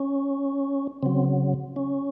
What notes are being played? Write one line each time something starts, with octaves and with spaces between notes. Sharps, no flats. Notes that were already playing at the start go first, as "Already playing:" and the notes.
Already playing: C#4
C#3 F#3 C4
C#4